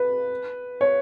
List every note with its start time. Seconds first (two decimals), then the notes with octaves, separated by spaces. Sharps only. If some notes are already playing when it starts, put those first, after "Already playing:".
Already playing: B4
0.81 C#5